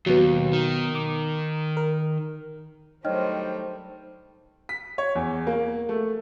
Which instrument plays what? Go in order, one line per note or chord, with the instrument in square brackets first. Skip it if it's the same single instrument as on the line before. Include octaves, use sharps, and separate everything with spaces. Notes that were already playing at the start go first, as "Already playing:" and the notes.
[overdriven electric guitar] D#2 [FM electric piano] B2 F#3
[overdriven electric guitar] D#3
[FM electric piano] D6
A#4
[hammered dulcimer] D#3 [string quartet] F#3 G3 A3 [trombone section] C5 [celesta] C#5 D#5 F6
[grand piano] B6
C#5
E2
A#3
A3